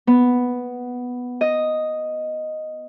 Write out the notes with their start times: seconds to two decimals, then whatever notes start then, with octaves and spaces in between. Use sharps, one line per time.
0.07 B3
1.41 D#5